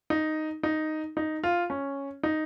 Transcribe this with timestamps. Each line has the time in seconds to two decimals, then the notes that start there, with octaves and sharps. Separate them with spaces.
0.10 D#4
0.63 D#4
1.17 D#4
1.43 F4
1.70 C#4
2.23 D#4